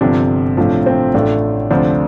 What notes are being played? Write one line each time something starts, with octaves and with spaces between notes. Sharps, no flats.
G1 G2 C3 F3 D4
A1 A2 F3 A3 D4
C4
A1 A2 A3 D4 F4
D2 C3 F3 C4 D4 F4